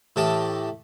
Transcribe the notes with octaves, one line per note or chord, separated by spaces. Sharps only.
A2 E3 G4 A#4 A5 D#6